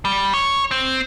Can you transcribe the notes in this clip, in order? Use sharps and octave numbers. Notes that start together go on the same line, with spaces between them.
G3
C#5
C4